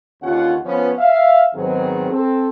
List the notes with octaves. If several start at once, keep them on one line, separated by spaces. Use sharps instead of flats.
D#2 D3 C#4 F4 F#5
F3 B3 C#4
E5 F5
G#2 D#3 F#3 B3 C4 G#4
C4 A4